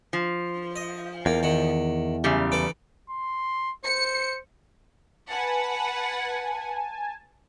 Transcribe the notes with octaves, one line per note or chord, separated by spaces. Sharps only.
F3
D#5
E2 A#3
D#3 F#5
F#2 C#3 G3
E3 A4 D6
C6
C5 C#7
B4 F#5 G#5 A5